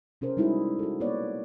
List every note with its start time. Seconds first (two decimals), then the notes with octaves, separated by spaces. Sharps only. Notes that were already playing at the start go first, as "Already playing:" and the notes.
0.21 C3 C#4 G#4 A#4 C5
0.37 G3 G#3 D#4 E4 F#4 G#4
0.79 F#4 A4
1.00 A#3 B3 B4 C#5 D5